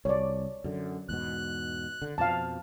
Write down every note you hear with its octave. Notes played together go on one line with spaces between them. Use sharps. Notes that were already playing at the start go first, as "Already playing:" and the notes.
C2 C#5 D5
F#2 D3
E2 G#2 B2 F#6
D3
F2 B2 F3 F5 A5